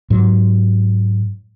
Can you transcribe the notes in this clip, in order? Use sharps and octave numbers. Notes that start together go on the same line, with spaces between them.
G#2 F#3